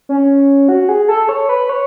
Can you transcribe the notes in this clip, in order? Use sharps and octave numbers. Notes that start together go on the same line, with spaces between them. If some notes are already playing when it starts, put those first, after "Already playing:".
C#4
F#4
G#4
A4
C#5
B4
C#5